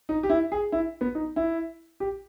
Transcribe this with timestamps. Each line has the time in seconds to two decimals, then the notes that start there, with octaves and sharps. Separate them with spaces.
0.09 D#4
0.23 G4
0.30 E4
0.52 G#4
0.72 E4
1.01 B3
1.15 D#4
1.36 E4
2.00 G4